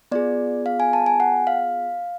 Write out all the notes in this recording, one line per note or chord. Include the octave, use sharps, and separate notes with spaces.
B3 F4 G#4 D5
F5
G#5
A5
G#5
F#5
F5